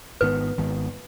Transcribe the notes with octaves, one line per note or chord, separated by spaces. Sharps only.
G#1 G#2 D#3 B3 B4
G#1 G#2 D#3 B3